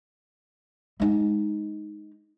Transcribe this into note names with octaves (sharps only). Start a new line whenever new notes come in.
G#3 D#4